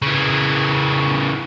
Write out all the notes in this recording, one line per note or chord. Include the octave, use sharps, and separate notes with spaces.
C#3 E3